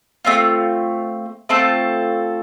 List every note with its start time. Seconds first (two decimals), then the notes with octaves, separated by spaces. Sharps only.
0.25 A3 C4 F4
1.49 A3 C4 F4 A4